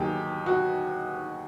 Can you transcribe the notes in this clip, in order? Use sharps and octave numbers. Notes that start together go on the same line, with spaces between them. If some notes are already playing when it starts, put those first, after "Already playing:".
Already playing: D#2 D#3 F#3 G4 G#4
F#4